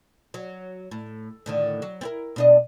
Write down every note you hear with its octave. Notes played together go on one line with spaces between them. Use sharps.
F#3
A2
A2 D3 D#3
F#3
C4 E4 A#4
B2 D4 D#5